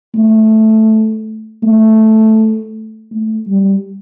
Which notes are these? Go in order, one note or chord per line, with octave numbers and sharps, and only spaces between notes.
A3
A3
A3
G3